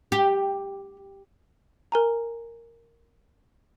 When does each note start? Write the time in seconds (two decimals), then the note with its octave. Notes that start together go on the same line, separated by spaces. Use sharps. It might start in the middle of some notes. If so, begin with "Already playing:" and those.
0.12 G4
1.92 A#4 G#5 A#5